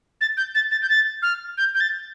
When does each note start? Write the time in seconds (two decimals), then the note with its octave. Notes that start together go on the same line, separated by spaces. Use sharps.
0.21 A6
0.37 G6
0.55 A6
0.71 A6
0.82 G6
0.89 A6
1.22 F6
1.57 G6
1.74 G6
1.80 A6